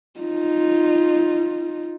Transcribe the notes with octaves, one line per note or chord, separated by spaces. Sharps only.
D#4 F4